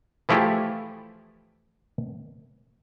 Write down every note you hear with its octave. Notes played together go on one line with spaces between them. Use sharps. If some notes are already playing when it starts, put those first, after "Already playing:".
E3 F3 A3 E4 G4 G#4